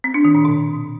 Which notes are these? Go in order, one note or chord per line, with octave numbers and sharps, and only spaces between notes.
C4
D4
D#3
A#2
B2